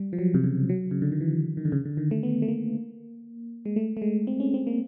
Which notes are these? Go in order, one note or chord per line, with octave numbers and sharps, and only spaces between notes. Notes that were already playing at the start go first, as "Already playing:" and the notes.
Already playing: G3
F3
F#3
C3
C#3
F#3
C#3
D3
D#3
E3
D#3
D3
C#3
D3
D#3
A3
B3
A3
A#3
G#3
A3
A3
G#3
C4
C#4
C4
A#3